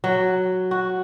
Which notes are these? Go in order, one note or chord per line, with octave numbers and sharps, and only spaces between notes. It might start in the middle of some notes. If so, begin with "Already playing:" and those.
F#3
F#4